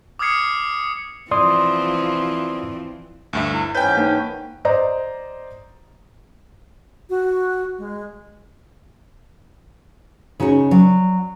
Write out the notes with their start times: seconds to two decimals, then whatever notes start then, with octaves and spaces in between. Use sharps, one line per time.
0.19 D6 D#6 F6 G#6 C7 C#7
1.31 E3 F3 C4 D5 C6 D#6
3.33 D2 G2 E5
3.54 E4
3.75 E2 G#2 C#4 B4 C#5 D#5 G5 G6
3.97 A#3 D4 D#4 F#5
4.65 C5 D5 D#5 A#5
7.10 F#4
7.78 G#3
10.40 C#3 D#4 F#4 C#5
10.71 F#3 D5